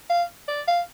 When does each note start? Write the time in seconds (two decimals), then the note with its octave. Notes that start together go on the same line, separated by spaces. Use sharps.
0.10 F5
0.48 D5
0.68 F5